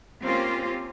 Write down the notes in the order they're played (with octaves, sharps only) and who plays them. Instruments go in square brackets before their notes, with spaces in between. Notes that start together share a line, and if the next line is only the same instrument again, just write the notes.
[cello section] A#3 C4 C#4 F4 G4